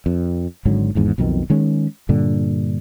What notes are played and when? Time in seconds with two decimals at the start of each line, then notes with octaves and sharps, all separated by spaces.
0.06 F2
0.65 G#1 G#2 D3 F#3
0.95 G#1 E2 G#2
1.18 B1 F2 B2 D#3
1.50 D#3 G#3 C#4
2.09 G2 A#2 D3